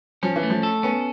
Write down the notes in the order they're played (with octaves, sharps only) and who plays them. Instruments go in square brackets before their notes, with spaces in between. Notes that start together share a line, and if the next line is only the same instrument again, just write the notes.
[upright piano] F3 [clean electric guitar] C#4
[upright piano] E3
[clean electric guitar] A3
[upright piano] F3
[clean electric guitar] A4
[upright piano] B3 [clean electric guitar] C#4